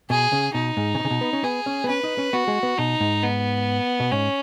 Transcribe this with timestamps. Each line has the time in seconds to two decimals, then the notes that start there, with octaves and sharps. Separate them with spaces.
0.10 B2 G#4
0.32 C#3
0.54 B2 D#4
0.77 G#2
0.95 C#3
0.99 B2
1.05 C#3
1.11 B2
1.21 B3
1.33 C#4
1.44 B3 G#4
1.66 C#4
1.84 B3
1.89 C#4 B4
2.04 D#4
2.18 C#4
2.33 B3 F#4
2.48 G#3
2.63 B3
2.78 B2 D#4
3.00 G#2
3.23 B3
4.00 B2
4.12 G#2 C#4